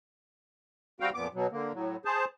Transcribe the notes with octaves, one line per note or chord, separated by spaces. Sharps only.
G3 C4 F#4 F5 G5
F2 A#2 B3 D6
B2 F#3
D3 A#3
A2 F#3
G#4 C5 A5